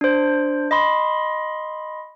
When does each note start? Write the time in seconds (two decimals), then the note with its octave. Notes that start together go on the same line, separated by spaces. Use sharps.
0.01 D4 C5
0.71 D#5 B5 C6